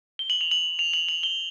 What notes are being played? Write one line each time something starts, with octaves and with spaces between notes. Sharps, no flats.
G7
F#7
F7
F#7
F7
F#7
F#7
G7